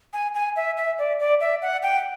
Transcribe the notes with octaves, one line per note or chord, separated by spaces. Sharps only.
G#5
G#5
E5
E5
D5
D5
E5
F#5
G5